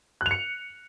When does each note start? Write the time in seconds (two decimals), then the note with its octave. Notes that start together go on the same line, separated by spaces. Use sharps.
0.21 F#6
0.26 F7
0.31 C#7